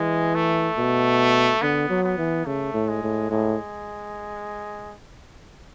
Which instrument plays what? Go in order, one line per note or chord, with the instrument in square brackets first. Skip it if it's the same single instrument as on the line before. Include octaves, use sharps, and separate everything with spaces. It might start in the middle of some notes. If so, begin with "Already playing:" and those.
Already playing: [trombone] E3 [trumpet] G#3
[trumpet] A3
[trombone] B2
[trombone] D3 [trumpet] B3
[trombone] F#3
[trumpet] B3
[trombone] E3
[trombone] C#3 [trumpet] A3
[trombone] A2
[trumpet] G#3
[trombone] A2
[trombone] A2 [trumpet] G#3